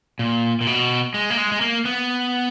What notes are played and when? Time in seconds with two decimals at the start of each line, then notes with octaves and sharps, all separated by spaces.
0.19 A#2
0.61 A#2
0.67 B2
1.14 G#3
1.30 A#3
1.37 G#3
1.52 G#3
1.61 A#3
1.85 B3